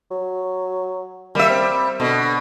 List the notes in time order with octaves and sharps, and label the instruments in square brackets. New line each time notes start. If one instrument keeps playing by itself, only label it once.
[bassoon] F#3
[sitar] G3 E5 [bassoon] A#3
[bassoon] C4
[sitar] B2 [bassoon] D3